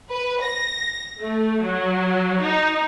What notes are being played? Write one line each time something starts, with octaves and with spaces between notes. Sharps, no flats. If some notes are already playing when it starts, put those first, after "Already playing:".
B4
A#6
A3
F#3
D#4